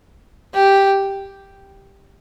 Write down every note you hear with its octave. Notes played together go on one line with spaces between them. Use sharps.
G4